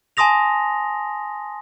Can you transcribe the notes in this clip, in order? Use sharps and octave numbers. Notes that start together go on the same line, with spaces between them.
G#5 A5 C6 D#6 A#6 F7